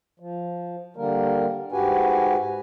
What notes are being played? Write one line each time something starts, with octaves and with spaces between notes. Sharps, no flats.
F3
D3 G3 A#3 A#4
G#2 F#4 G4 B4 G#5